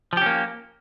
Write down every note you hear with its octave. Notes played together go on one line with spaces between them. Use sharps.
F3 A#3 C#4 G4